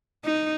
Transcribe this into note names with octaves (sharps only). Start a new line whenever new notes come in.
D#4